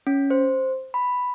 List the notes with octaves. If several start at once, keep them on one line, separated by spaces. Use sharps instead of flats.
C#4
C5
B5